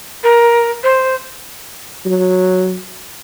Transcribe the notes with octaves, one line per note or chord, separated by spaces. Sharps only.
A#4
C5
F#3